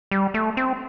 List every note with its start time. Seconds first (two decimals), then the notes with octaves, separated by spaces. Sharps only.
0.11 G3
0.34 A3
0.57 C4